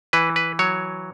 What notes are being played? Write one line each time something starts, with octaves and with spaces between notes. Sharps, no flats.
E3 B4
B4
F#3 C#5